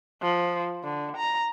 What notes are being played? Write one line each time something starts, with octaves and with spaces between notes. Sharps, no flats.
F3
D3
A#5